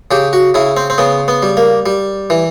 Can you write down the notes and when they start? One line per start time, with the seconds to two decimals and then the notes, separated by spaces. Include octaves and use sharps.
0.11 C#3 G4
0.33 F#4
0.54 C#3 E4
0.77 C4
0.90 C4
0.98 C#3 B3
1.28 B3
1.43 G3
1.57 A#3
1.86 G3
2.30 E3